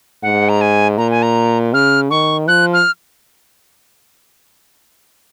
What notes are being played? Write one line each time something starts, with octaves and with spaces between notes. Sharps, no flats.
G#2 F#5
A#5
G#5
A#2 A#5
G#5
A#5
C#3 F6
D#3 C#6
F3 F#6
F6